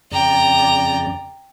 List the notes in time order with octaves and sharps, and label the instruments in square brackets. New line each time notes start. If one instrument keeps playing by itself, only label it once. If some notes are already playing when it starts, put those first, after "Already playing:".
[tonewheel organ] F2 C#3 D5 [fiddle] G5 A#5